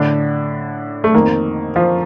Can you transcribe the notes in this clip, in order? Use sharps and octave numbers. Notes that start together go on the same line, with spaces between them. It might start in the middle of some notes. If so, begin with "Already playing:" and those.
Already playing: A2 D3 D4
A3
F2 D#3 A#3
F3 F4